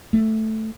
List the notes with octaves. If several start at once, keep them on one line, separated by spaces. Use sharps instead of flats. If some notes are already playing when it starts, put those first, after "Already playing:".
A3